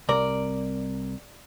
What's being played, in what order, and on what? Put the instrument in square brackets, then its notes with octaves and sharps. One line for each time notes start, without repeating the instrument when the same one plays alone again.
[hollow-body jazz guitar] C2 A#4 [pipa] D5